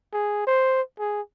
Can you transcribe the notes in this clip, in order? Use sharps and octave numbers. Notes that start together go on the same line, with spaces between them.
G#4
C5
G#4